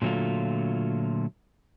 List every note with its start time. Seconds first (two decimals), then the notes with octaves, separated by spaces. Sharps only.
0.02 A#2 D3 F#3 A3 F4